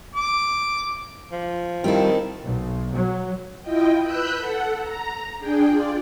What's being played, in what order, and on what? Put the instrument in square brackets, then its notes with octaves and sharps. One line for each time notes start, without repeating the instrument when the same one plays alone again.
[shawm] D6
[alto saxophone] F3
[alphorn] D#3 [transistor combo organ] G3 F4 [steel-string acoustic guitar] C4 E4 A4
[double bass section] B1
F#3
[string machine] E4 F4 D#5 G5
B4 B5 E6 F#6 G6
A4 F#5
A#5
D4 G#4 G5
F4 D5